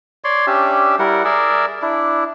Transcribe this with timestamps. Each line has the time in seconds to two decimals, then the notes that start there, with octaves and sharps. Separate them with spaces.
0.24 C#5 D5 C6
0.47 C#4 D4 G4 E5
0.99 G3 E4 A#4 F#5
1.25 G#4 A#4 D5 E5
1.82 D4 E4